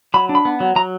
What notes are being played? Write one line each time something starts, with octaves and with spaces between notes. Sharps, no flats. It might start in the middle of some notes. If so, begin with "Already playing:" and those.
F#3 B5
D4
B5
B3
F#3
F#3 A#5